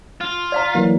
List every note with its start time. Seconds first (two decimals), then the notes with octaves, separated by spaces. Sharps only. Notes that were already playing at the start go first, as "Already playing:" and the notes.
0.21 F4
0.52 D5 F5 A#5
0.75 E3 F#3 A#3